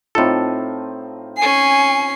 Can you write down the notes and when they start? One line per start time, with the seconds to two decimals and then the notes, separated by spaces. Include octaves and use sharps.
0.15 A2 C4 D#4 F4 A4
1.37 C#4 G#5 C7